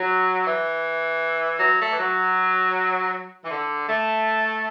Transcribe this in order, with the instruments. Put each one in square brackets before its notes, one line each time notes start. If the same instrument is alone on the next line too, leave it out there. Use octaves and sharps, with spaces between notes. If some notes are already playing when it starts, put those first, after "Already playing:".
Already playing: [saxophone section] F#3
E3
F#3
A3
E3
F#3
E3
D3
A3